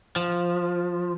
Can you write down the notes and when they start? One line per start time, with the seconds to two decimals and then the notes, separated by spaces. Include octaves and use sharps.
0.16 F3